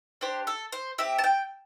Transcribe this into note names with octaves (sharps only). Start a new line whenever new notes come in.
D4 G4 C5
A4
C5
C4 G4 E5
A5
G5